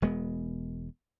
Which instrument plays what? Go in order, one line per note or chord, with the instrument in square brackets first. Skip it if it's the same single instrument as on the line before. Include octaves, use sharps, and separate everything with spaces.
[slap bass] E1 G#3 B3